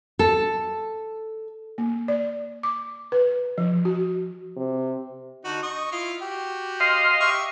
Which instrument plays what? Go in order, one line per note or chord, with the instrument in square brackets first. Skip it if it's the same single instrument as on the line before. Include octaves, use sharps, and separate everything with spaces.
[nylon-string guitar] A4
[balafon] A#3
D5
D6
B4
F3
F#4
[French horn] C3
[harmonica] D3 D#4 F#4
D#5 C#6 D#6
E4 F4 F5
F#4 G4
[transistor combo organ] D#5 F5 C6
[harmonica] G4 E5 C#6